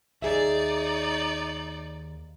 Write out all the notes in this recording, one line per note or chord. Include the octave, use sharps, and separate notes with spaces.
D#2 D#4 G#4 D5 E5